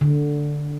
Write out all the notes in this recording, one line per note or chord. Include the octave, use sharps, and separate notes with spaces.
D3